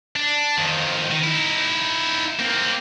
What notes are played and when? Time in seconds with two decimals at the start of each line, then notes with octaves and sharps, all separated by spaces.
0.16 D4
0.58 F2 D#3
1.11 D#3
1.23 D#4 E4
2.39 A#3 C4